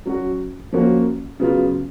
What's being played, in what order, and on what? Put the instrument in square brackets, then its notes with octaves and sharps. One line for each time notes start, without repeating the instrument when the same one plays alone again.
[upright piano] F#3 C#4 F#4
F3 A#3 C#4 F#4
C#3 F#3 B3 F4